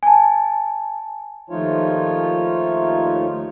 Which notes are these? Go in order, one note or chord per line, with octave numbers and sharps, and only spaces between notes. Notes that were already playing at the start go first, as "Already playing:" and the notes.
G#5 A5
D#2 F3 A3 D#4 F4 C#5